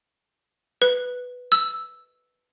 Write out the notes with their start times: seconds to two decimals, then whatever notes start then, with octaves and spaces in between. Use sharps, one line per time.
0.82 B4
1.52 E6